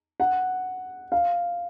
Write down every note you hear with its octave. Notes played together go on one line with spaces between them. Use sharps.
F#5
F5